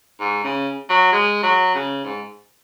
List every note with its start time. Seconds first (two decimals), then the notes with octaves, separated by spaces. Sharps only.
0.20 G#2
0.44 C#3
0.90 F#3
1.13 G#3
1.43 F#3
1.75 C#3
2.04 G#2